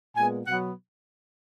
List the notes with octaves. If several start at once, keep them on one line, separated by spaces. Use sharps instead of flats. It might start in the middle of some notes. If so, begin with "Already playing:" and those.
A#2 G#3 B3 G#5
B2 F#3 B3 F#5